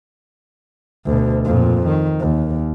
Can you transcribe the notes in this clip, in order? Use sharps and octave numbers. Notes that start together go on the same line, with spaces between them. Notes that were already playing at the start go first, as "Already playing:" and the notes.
D2 B2
F2 A#2
D#3
D#2